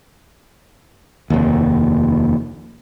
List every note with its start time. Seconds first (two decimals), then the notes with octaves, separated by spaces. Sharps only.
1.30 F1 D#2